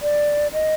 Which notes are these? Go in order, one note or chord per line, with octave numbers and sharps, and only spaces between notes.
D5
D#5